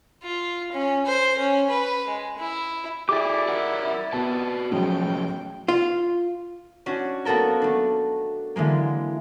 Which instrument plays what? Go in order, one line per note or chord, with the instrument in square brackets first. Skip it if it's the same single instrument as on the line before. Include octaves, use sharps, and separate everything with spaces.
[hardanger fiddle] F4
C#4
C5
C#4
B4
G#3
E4
[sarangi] E4 [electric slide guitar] G4 G#4 [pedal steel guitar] D5 D6
[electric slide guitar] A#4 E5 F#5
[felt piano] B3 [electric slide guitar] F#4 B4 A5
[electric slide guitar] A2 F3 [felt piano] F#3 G#3 C#4 [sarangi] G5
[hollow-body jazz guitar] F4
[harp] C#4 D4 F#4
A#3 B3 F#4 A4 A#4
A3 D4
D3 E3 G#3 A#3